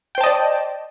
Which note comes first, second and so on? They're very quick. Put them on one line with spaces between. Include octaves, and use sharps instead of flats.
G5 C5 A5 D#5 D5